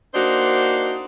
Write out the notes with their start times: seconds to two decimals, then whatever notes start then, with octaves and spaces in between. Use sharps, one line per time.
0.14 A#3 D4 D#4 F#4 C5